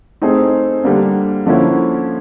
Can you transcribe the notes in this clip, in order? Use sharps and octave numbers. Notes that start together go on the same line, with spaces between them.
A3 C4 D#4 G#4 C5
D3 G3 A#3 D4
D3 F3 A#3 C#4 E4